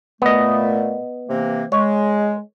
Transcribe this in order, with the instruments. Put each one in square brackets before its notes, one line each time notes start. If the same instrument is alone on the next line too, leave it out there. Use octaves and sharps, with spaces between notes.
[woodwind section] A#2 A3 [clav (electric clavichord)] B3 D#5
[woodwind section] C3 E3 A#3
[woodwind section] G#3 [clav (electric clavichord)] C#5